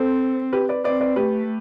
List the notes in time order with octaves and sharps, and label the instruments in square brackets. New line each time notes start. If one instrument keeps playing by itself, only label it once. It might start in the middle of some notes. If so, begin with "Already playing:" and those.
Already playing: [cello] C4 [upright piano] A4 C5
[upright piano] G4 B4
B4 D5
[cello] C4 [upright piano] B4 D5
[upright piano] B4 D5
[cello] A3 [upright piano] G4 B4